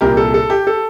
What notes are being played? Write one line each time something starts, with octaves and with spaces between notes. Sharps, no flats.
C2 A#2 G3 G4 A#4
A4
A4
G4
A4